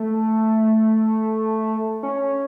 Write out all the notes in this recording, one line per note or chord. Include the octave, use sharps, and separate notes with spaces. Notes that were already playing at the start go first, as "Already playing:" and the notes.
Already playing: A3
C#4